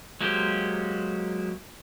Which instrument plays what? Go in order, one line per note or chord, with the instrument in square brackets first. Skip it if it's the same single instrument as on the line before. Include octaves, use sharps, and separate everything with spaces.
[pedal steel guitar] F#3 G#3 A#3 G4 C5